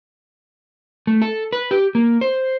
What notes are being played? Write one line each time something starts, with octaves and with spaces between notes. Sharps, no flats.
A3
A4
B4
G4
A#3
C5